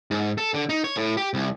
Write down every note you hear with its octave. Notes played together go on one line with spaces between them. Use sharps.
G#2
A4
D3
D#4
C#5
A2
G4
C2